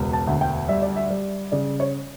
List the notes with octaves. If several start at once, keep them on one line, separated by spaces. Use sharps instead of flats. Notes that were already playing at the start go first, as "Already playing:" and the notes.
Already playing: E1 C#2
A5
D2
G5
G3 E5
D5
E5
G3
C#3 D5
C#5